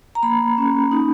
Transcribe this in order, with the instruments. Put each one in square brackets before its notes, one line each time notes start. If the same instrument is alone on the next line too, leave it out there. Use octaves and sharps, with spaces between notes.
[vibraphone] A#5
A#3 B5
C#4
D#4